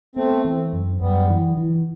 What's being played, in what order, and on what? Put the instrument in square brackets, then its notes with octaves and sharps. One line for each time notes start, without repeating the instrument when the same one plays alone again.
[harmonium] A3 C4 [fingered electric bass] B3
[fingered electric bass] E3
F#2
[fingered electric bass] F#2 [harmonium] G3 B3
[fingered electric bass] E3
E3